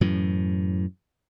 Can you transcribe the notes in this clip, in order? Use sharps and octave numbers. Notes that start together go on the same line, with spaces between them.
F#2 A2 E3